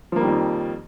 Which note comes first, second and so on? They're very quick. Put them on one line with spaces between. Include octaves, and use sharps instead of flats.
F3 A#3 G3 D#3 F2